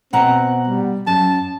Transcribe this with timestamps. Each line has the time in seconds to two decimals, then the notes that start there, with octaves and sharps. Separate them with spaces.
0.13 B2 C4 F#5 A#5
0.68 G3
1.07 F#2 A5